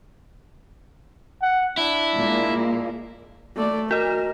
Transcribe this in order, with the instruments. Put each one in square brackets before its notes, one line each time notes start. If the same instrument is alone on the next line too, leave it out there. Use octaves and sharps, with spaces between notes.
[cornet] F#5
[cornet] D4 [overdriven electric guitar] E4
[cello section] A#2 G#3 A#3
[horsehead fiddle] A3 D5
[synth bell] F#4 D#5 [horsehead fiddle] A#4